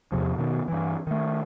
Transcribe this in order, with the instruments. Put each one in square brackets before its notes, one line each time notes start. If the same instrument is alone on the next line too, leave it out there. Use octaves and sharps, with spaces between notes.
[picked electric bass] E2 C3 F3
B2 D#3 B3
G2 E3
D#3 A3